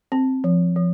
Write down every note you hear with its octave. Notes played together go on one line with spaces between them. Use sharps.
C4
F3
F3